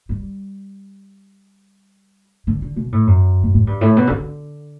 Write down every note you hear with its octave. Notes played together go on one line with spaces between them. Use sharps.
G3
D3
D3
B2
A2
F#2
B2
A2
G2
A2
B2
C#3
D3